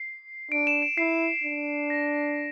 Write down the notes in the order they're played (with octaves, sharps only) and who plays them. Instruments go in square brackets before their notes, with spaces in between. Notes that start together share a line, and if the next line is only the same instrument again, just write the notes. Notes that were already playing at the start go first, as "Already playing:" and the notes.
Already playing: [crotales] C7
[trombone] D4 [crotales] D7
[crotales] E7
D7
[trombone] E4 [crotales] C7
[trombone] D4
[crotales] A#6